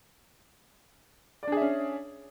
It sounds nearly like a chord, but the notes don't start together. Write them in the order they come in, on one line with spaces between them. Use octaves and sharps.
D5 D4 G#4 E5 C#4